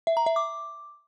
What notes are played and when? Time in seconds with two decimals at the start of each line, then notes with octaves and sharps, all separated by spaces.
0.07 E5
0.17 A#5
0.26 E5
0.36 D6